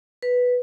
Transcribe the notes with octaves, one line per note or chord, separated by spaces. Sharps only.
B4